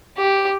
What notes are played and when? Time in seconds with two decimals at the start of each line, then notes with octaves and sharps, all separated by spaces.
0.18 G4